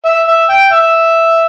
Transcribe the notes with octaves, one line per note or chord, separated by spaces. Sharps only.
E5
E5
G5
E5